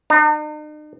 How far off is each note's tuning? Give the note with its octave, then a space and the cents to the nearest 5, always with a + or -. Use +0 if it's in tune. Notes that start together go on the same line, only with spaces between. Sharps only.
D#4 -45